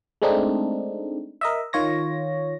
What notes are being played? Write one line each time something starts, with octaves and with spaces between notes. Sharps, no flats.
G#3 A3 C4 D4 D#4
A#4 D#5 E5
D#3 F4 C#5 A#6